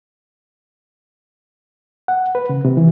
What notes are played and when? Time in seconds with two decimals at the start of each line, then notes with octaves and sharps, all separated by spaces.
2.08 F#5
2.35 B4
2.49 C#3
2.65 C3
2.77 E3